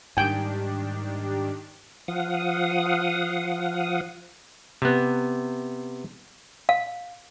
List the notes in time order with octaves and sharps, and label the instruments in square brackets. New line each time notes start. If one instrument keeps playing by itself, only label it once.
[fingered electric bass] G#2 G3 [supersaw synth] D#3 D4 G4 [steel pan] G5 G#5
[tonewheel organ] F3 F5 F#5 D#6
[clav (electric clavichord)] C3 B3
[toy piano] F5